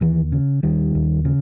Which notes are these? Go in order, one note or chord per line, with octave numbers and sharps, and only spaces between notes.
D#2 E3
C#3
D#2 D#3 G3
D#2
C#3